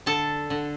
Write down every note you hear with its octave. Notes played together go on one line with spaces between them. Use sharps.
D3 A4 A5
D3